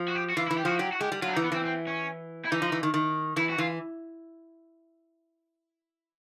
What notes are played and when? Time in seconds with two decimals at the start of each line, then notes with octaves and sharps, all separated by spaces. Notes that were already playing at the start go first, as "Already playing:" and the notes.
Already playing: F3
0.08 F#4
0.15 G4
0.30 F#4
0.36 E3 F4
0.48 E4
0.51 E3
0.57 G4
0.65 F3 F#4
0.79 F#3 G4
0.92 F#4
1.01 G#3 G4
1.12 G3
1.22 F#3 F4
1.27 D4
1.33 D#4
1.36 E3
1.44 B3
1.52 E3 C4
1.65 C4
1.87 C#4
2.45 E4
2.51 E3 D#4
2.62 F3
2.72 E3
2.83 D#3
2.94 D#3
3.37 E3 E4
3.50 F#4
3.58 E3 F4